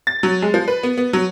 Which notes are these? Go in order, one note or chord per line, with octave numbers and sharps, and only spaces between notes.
A6
F#3
G#3
F3
B4
B3
B3
F#3